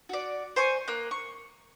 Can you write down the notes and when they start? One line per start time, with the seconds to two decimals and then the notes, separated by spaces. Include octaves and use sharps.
0.09 F#4 D5
0.56 C5 G#5 C#6
0.88 A#3 F#6
1.11 C#6